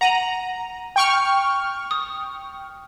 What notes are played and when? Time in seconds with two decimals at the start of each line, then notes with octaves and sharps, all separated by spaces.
0.01 F#5 A#5 D#7 F#7
0.96 G5 C#6 F6
1.91 D#6